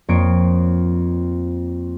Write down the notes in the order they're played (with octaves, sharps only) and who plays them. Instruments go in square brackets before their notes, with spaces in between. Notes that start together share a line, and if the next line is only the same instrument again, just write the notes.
[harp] F2 A#3 C4 C#5 C7 D7